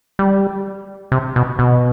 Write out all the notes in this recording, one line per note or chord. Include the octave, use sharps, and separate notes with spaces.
G3
C3
B2
B2